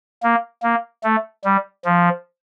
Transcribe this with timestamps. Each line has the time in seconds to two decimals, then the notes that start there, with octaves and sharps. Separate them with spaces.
0.23 A#3
0.63 A#3
1.04 A3
1.45 G3
1.85 F3